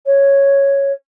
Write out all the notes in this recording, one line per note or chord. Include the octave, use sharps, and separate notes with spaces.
C#5